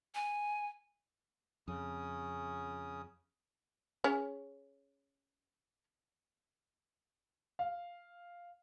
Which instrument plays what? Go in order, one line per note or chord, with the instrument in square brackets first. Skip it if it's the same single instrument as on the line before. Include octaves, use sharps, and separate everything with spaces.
[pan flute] G#5
[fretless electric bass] F2 [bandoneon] C#3 C#4 D#6
[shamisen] C#4 G#4 C#5
[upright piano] F5